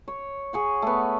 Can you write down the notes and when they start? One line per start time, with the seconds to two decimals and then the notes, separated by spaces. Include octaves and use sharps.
0.08 C#5
0.53 G#4 C#5 F#5
0.82 A3 B3